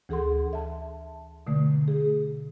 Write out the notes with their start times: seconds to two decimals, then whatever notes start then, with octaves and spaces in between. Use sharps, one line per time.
0.09 D2 E3 G#4 A4 F#5 C6
0.53 E5 A5
1.47 B2 D3 A3
1.88 G#4